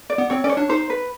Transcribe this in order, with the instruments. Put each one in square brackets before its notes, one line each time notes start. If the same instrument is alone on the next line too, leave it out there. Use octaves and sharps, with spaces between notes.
[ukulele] D5
[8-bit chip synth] B3
[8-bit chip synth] C4 [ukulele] C#5
[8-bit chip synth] C#4 [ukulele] D5
[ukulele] C#5
[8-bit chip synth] D4
[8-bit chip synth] D#4 [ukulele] C5
[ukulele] B4